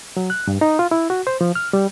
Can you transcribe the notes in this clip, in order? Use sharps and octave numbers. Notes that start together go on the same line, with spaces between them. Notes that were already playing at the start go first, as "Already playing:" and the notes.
F#3
F#6
G2
D#4
F4
E4
F#4
C5
F3
F6
G3